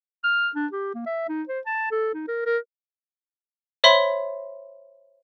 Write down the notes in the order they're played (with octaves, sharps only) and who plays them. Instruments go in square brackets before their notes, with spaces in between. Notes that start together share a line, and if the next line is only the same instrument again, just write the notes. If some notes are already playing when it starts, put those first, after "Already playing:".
[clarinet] F6
D4
G4
A#3
E5
D#4
C5
A5
A4
D#4
A#4
A#4
[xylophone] C5 C#5 E5 B5 C6